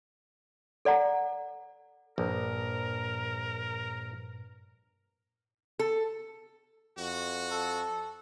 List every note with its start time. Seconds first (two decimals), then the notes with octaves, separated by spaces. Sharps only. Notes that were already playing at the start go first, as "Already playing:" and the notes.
0.85 A4 D5 F#5 A#5
2.18 A#1 G2 A#2 A#4 B4
5.79 A4
6.98 F2 F#4
7.51 A4